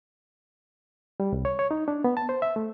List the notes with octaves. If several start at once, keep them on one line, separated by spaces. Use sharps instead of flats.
G3
C2
C#5
C#5
D#4
D4
B3
A5
C5
E5
A3